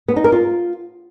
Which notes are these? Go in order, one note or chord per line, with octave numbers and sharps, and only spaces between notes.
B3
D#4
A#4
F4